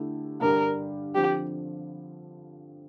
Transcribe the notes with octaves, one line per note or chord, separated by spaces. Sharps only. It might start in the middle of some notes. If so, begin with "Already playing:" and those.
Already playing: D3 A3 E4 G4
G2 D3 G3 D4 G4 A#4
D3 F3 C4 G4